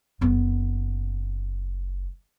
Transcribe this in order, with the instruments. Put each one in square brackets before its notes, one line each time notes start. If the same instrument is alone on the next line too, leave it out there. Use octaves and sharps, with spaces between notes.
[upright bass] F#1 B3